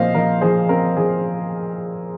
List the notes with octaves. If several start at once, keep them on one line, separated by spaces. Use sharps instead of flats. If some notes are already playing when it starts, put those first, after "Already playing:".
Already playing: A#2 F3 C4 C5 D#5 F5
F3 A#4 D#5
F3 G#4 C5
C4 A#4
F3 G#4